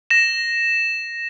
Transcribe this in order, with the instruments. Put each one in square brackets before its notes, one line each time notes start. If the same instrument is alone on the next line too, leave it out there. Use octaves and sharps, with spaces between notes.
[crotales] A#6 E7